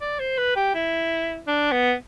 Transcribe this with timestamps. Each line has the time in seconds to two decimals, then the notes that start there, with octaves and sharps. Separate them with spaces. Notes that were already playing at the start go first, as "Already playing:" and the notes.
0.01 D5
0.19 C5
0.38 B4
0.56 G4
0.74 E4
1.47 D4
1.72 B3